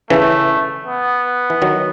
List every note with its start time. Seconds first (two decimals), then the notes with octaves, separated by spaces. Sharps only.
0.10 C#3 E3 A3
0.86 B3
1.50 E3
1.62 D#3 F#3